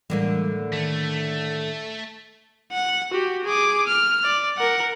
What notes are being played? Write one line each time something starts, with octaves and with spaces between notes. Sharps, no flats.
A2 D3 E3 G3 G#3 A#3
D#3 A3
F#5
F#4 G4
G#4 D6
F6
D5
A#4 F#5